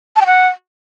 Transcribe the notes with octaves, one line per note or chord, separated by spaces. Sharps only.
A5
G5
F#5